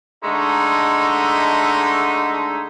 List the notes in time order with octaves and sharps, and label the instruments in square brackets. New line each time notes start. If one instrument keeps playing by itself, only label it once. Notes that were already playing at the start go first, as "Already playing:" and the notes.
[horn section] D3 G#3 A3 D#4